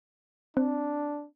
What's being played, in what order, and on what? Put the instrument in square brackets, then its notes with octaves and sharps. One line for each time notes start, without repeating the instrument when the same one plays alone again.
[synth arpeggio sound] C4 [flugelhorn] D4